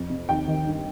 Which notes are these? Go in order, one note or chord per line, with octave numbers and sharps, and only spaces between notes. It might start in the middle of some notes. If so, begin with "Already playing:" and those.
Already playing: F2
C3
D#2 G5
D#3
G2